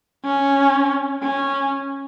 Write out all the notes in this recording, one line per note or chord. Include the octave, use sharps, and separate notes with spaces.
C#4
C#4